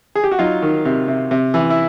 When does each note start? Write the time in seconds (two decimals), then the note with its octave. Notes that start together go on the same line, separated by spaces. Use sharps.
0.15 G#4
0.24 G4
0.31 F#4
0.39 F#3 D#4 F4
0.62 D#3
0.85 C3
1.08 C3
1.31 C3
1.54 E3
1.70 E4